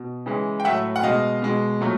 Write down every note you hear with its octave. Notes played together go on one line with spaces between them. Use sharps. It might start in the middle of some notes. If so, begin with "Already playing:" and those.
Already playing: B2
C#3 E3 G#3
G5
A2 F#3 A3 E5 F#5
F#5
B2 G#3 D#5 F5
B2 G#3
A#2 F#3 A3